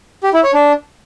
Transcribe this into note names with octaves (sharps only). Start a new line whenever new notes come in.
G4
E4
C#5
D4